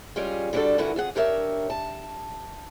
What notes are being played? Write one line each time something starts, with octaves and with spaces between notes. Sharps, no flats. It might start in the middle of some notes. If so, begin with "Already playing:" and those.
G3 G#3 C#4 F4
D3 G3 B3 D4 F#4 A4
G2 A#2 D3 E4 F#4 B4
F2 G#4 F#5
D4 G4 A#4 C#5 E5
A5